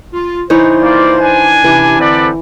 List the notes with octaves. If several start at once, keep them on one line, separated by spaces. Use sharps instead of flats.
F4
E3 D#4 C5 C#5
A#3 F4 D5
D4 G#5
C3 E3 C#4 G4
D3 C4 A4 B4 C5 D5